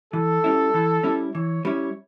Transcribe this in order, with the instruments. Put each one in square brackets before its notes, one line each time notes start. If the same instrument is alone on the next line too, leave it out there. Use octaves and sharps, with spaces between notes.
[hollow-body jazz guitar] E3 [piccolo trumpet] A4
[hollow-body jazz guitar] G3 C#4 E4
E3
G3 C#4 E4
[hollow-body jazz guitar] E3 [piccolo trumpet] C#5
[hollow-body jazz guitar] G3 C#4 E4 [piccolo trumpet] C#5